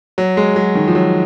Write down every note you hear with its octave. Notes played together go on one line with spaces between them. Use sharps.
F#3
G#3
F#3
D#3
F3
F#3